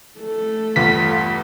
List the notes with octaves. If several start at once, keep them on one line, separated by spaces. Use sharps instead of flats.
A3 A4
A1 E2 G2 F4 B6